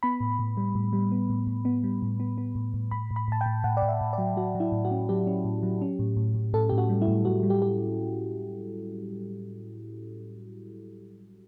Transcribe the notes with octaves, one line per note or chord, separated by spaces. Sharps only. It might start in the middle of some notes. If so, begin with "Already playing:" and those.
B3 B5
A2
A2
G3
A2
G3
B3
A2
A2
B3
G3
A2
B3
B3
A2
A2
A2 B5
A2
B5
A2 A5
G5
A2
A2 F#5
D5
A2
E5
A2
D5
F#3
F#3 F#4
F#3
E4
A2
F#4
C#4
F#3 G4
C#4
A2
F#3
C#4
A2
A2
A2
A2 A4
A2 G4
F#4
G3
E4
A2
A2 F#4
G3
G4
G4